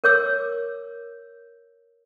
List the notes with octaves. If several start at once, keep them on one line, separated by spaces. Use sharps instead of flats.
A#4 C#5 D6 E6